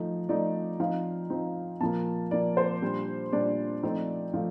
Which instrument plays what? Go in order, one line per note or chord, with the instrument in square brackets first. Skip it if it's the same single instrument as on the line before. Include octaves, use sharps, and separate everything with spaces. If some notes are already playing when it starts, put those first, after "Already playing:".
Already playing: [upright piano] F3 A3 D#4
F3 A3 D#4 D5
F3 C4 D#4 F5
F3 C4 D#4
A#2 F3 A#3 A5
A#2 F3 A#3 D5
C5
A#2 G3 D4
A#2 G3 D4 D5
F3 A3 C4 D#4
F3 A3 F5